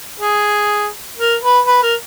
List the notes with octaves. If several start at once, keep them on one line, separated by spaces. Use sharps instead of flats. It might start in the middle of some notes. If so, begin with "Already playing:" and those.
G#4
A#4
B4
B4
A#4